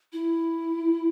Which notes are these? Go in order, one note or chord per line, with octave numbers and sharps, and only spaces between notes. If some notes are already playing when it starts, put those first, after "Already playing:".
E4